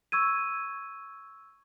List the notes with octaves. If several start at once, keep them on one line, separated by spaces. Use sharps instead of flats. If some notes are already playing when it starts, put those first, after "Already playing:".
C#6 E6 G#6 D#7